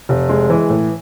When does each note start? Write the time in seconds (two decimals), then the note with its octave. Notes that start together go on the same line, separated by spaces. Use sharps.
0.09 F1
0.29 G#3
0.50 E3
0.70 A2